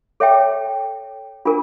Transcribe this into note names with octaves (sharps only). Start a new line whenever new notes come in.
A4 C#5 E5 G5
D4 F4 A#4